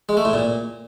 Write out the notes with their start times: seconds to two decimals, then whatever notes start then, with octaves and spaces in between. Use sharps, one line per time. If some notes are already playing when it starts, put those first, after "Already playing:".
0.09 G#3
0.17 A3
0.25 A2
0.33 A#2